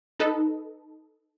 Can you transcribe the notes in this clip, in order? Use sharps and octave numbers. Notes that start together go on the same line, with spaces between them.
D#4 A4 B4 D#5